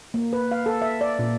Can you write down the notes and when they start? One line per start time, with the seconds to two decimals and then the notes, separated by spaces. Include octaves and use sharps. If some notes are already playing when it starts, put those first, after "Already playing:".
0.14 A#3
0.33 B4
0.51 F5
0.66 A4
0.82 E5
1.01 D5
1.19 A#2